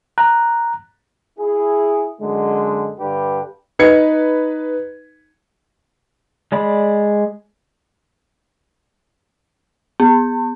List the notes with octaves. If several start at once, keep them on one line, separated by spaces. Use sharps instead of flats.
A#5 F#6
E4 G#4
F#2 D3 G#3
G2 D3 D4 G4 B4
D#4 B4 G#6 C#7
G#3 D5 B5
B3